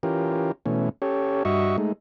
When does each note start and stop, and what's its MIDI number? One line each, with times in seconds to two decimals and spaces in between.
0.03 0.52 52
0.03 0.52 61
0.03 0.52 65
0.03 0.52 67
0.03 0.52 70
0.66 0.89 47
0.66 0.89 52
0.66 0.89 57
0.66 0.89 61
1.02 1.43 61
1.02 1.43 67
1.02 1.43 69
1.02 1.43 73
1.45 1.77 43
1.45 1.77 66
1.45 1.77 75
1.45 1.77 76
1.45 1.77 85
1.78 1.92 56
1.78 1.92 57
1.78 1.92 63